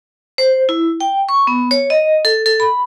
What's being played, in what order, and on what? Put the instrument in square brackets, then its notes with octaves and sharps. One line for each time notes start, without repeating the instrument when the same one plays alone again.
[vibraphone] C5
E4
G5
C#6
B3
C#5
D#5
A4
A4
B5